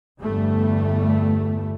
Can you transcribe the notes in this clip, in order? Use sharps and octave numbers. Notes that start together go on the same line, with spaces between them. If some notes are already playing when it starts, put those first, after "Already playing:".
G1 E2 G3 A3